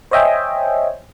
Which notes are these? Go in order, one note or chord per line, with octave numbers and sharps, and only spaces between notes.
C5 C#5 D#5 E5 G5 G#5